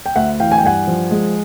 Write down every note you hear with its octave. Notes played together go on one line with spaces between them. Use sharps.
G5
D2 E5 F#5
E3 F5 G5
G#5
G5
G2 F#5 G#5
F3
G#3